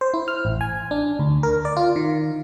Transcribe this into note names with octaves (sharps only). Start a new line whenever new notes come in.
C5
E4
F6
A1
G#5
D4
D2
A#4
D5
F4
D#3